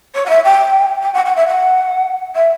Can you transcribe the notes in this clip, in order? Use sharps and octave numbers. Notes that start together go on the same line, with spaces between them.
C#5
F#5
E5
G5
G5
F#5
F#5
E5
F#5
E5